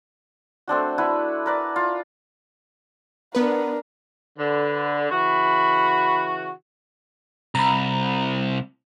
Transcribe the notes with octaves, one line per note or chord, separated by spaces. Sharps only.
A3 C4 D4 F#4
E4 F#4 B4
A#4 B4 D5
F4
B3 D4 A#4 B4
D3 B4
C#3 E3 F#4 B5
C2 A#5 B5